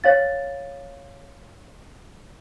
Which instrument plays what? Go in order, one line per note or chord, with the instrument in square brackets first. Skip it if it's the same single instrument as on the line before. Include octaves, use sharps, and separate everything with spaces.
[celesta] C#5 F5 A6